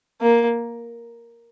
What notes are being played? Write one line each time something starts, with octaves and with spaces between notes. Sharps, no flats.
A#3